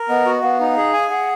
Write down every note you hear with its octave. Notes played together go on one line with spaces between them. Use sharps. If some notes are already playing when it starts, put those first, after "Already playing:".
Already playing: A#4
B3 D#5
F#4
B3 F5
D#4
G#4
G#5
G#4 F#5